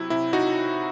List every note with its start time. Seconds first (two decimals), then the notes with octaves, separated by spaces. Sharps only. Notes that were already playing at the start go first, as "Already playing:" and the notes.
Already playing: C3 F#3 E4
0.10 C3 E4
0.33 D#4 F#4